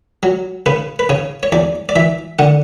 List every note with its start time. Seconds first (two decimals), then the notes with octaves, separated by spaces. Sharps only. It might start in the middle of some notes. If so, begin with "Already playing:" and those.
0.23 F#3
0.66 C#3 B4
0.99 B4
1.09 C#3 C#5
1.43 C#5
1.52 E2 D5
1.89 D5
1.96 E3 E5
2.39 D3 F#5